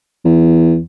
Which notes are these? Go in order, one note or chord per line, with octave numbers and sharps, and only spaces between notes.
E2